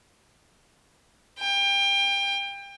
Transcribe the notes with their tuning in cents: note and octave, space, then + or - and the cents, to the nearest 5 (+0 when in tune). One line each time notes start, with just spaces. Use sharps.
G5 +30